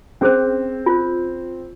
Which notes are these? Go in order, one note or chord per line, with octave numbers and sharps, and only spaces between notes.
C4 C#4 G#4 C5
F4 C5